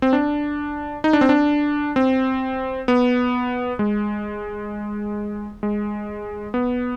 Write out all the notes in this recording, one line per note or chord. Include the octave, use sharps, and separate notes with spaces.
C4
D4
D#4
D4
C4
D4
C4
B3
G#3
G#3
B3